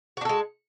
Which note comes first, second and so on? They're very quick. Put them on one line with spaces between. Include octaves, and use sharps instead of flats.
F#4 D4 A4 G#3